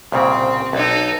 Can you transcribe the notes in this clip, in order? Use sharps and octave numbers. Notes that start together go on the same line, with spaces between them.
C2 A#2 C#3 C4
B1 D#4 A4